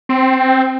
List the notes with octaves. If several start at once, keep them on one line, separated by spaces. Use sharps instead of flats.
C4